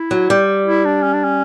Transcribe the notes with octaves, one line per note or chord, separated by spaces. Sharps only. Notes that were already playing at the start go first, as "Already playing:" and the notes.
Already playing: E4
F#3
G3
E4
D4
C#4
D4
C#4